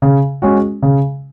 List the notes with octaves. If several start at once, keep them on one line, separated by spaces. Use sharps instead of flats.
C#3
G#3 C#4 F#4
C#3